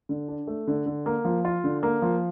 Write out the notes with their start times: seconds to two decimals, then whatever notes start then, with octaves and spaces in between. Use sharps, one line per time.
0.09 D3
0.28 D4
0.47 A3
0.68 D3
0.86 D3
1.06 A#3
1.25 F3
1.45 F4
1.64 D3
1.83 A#3
2.02 F3